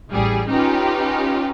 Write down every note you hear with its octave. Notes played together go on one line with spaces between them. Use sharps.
A1 G3 G#4
C#4 D#4 F4 G4 B4